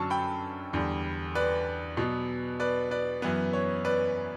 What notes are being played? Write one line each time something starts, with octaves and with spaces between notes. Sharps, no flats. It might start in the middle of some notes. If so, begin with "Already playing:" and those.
Already playing: F#2 D3 F#3 C#4 A5 C#6
G5 B5
E2 D3 G3
B4 D5
B2 F#3 B3
B4 D5
B4 D5
F#2 E3 B3 B4
C#5
B4 D5